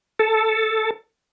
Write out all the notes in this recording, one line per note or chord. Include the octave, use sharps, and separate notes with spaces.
A4